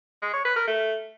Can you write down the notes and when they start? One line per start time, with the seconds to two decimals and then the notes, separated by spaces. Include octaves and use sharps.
0.22 G#3
0.34 C#5
0.45 B4
0.56 A#4
0.68 A3